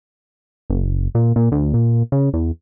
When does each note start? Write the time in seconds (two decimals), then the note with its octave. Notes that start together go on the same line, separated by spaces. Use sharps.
0.70 F#1
1.15 A#2
1.36 A#2
1.52 D2
1.74 A#2
2.12 C#3
2.33 E2